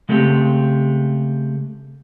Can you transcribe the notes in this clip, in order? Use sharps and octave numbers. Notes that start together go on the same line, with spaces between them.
C#3 G#3 A3 C4 G4